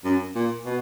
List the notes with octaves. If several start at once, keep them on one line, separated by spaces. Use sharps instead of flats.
F#2
A#2
B2